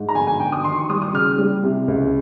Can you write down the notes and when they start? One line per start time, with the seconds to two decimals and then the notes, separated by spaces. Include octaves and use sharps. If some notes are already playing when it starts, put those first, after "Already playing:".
Already playing: G#2
0.09 A#5
0.15 G1 G#5
0.27 G#5
0.40 G1 G5
0.52 D#6
0.64 D#3 C6
0.77 C#6
0.89 G3 D#6
1.02 D#6
1.14 C#3 F6
1.38 G3
1.64 C3
1.88 C#2